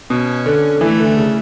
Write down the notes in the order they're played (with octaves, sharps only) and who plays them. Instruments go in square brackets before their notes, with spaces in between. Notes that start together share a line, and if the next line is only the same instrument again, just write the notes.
[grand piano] B2 [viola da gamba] C#4
[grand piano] D3
[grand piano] E3 [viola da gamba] A3
[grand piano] D3
C#3